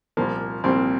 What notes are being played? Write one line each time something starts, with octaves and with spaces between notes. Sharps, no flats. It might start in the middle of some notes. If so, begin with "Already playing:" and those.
C2 A#2 F3 A#3
C2 A#2 F3 C4